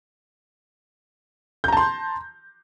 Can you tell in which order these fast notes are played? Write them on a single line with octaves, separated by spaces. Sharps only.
G6 A#5 A5 C6